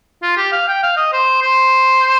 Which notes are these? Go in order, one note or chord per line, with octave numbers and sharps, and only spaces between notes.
F4
G4
F5
G5
F5
D#5
C5
C5